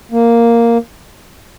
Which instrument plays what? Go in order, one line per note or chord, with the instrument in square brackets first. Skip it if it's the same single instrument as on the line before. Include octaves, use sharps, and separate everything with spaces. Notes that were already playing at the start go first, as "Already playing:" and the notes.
[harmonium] A#3